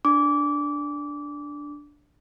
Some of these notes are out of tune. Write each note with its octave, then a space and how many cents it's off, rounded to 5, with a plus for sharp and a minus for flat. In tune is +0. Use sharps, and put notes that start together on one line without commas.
D4 +0 D6 -20